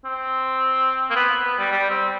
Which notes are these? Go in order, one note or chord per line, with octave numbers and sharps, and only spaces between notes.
C4
A#3
B3
B3
G3
G3
C4